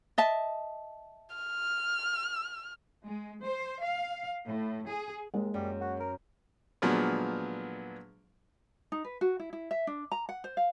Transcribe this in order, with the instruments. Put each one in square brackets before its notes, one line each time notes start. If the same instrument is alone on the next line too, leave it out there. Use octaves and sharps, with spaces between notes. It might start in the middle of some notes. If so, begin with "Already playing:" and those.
[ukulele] D#5 E5 A5
[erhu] F6
[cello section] G#3
C5
F5
A2
G#4
[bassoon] D#2 [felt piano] G#3 A#3
[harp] F#2 [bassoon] G3
[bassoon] F#4
A#4
[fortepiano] A#2 D3 F3 F#3 G#3 B3
[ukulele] D#4
B4
F#4
E4
E4
E5
D4
A#5
F#5
C5
F5